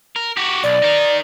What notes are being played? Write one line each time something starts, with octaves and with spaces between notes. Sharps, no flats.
A#4
F#4 G4
B1 D5
D#4 A#4